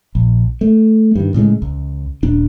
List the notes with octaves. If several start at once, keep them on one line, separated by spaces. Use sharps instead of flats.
A#1
A3
G2 D#3
A2 C#3 G3 G#3
C#2
D#1 D4